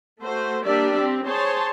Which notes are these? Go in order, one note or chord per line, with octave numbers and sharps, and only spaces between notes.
A3 F#4 C5
G3 A#3 D4 G4 D5 E5
C4 G4
G#4 C5 C#5 A5 C6